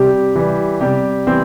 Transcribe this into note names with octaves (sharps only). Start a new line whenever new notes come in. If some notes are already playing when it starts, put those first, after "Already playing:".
Already playing: C3 G3 G4
E3 G3
C3 G3 G4
E3 G3 C4